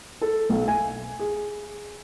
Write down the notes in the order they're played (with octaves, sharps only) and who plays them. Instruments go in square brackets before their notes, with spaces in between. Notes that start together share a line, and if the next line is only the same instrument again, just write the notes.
[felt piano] A4
B1
G#5
G#4